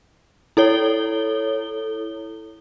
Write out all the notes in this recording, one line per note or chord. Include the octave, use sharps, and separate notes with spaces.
E4 A4 C#5 G7